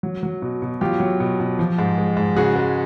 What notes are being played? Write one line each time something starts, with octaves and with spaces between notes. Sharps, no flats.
F#3
F#3
B2
B2
F#3 F4 G4
F#3
B2
B2
F3
G#2
G#3
G#2
C#3 F#4 G#4
G#3